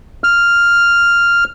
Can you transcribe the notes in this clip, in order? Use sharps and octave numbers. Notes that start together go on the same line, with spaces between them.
F6